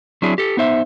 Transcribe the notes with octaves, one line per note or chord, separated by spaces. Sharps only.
F#3 C4 D4 E4 G#4
G4 A4
B3 D#4 C5 E5